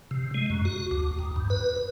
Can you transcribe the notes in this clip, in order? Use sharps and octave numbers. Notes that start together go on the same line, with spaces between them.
C3
G#3
F#2
F#4
D2
D#2
G2
B4